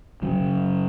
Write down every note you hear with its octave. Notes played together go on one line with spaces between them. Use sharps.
F#2 C#3 F#3